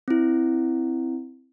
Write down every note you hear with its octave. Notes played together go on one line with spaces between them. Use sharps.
C4 E4